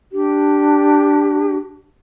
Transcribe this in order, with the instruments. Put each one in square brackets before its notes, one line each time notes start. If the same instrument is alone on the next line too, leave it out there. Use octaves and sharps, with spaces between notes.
[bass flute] D4 [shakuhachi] G4